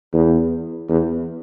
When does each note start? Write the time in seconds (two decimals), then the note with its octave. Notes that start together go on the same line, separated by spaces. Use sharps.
0.13 E2
0.89 E2